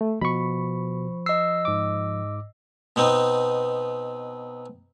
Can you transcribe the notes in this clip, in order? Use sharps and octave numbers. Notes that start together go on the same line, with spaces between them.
A3
B2 F3 B5 C#6
D#5 E6 C7
G#2 D6
B2 B3 C4 D#4